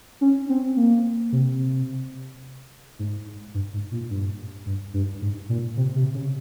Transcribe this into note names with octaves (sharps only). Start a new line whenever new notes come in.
C#4
C4
A#3
C3
G#2
G2
G#2
A#2
G2
G2
G2
G#2
A#2
C3
C3
C#3